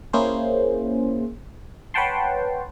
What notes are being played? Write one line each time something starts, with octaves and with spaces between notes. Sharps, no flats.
A#3 C#4 E4 G#4 C5
B4 C#5 F#5 G5 A5 C6